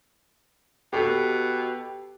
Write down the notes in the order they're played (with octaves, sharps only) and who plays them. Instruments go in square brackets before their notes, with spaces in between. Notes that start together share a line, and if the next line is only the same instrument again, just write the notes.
[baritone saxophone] B2 [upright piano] G4 A4